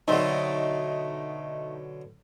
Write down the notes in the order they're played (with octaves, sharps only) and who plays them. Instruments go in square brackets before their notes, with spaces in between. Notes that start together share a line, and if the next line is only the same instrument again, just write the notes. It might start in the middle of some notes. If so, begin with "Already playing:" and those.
[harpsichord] B2 D3 F#3 [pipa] A3 C4 [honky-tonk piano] D#4